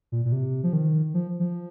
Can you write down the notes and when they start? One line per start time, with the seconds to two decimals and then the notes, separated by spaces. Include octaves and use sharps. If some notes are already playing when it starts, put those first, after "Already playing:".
0.12 A#2
0.25 A#2
0.32 C3
0.63 F3
0.73 D#3
1.14 F3
1.40 F3